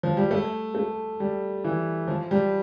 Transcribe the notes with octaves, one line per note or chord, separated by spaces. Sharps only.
F3
G3
A3
A3
G3
E3
F3
G3